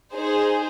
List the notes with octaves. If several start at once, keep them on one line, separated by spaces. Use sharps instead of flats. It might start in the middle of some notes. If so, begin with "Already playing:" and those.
D#4 G#4 C5